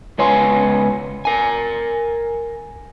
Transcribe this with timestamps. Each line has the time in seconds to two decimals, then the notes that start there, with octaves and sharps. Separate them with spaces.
0.19 C#2 B3 C#5 F5 G#5 C6
1.25 A#4 G#5